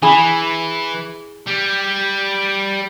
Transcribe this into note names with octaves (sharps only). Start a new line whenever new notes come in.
E3 E4 G#4 G#5
G3